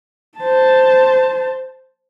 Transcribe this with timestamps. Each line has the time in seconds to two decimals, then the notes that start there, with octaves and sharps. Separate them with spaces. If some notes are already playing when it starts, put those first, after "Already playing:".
0.39 C5 A5